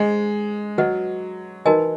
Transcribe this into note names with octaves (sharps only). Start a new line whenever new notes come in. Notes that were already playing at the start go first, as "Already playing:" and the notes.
Already playing: G#3 G#4 C5 D#5 G#5
F#3 B4 D#5 F#5
E3 D#4 F#4 A#4 D#5 G#5